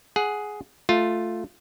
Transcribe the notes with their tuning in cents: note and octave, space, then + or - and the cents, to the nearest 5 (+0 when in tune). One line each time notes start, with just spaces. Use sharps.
G#4 +5 F#5 +0
A3 +0 F4 +5